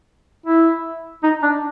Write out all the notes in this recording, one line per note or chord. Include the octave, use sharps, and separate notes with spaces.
E4
D#4
D4